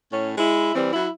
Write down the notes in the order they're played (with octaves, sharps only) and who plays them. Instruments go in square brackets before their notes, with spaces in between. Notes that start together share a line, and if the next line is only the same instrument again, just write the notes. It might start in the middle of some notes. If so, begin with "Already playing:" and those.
[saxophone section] A2 C#4
G#3 E4
E3 G3 C4
F#3 E4